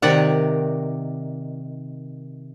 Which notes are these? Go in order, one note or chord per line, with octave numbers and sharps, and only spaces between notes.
C3 D#3 D5 F#5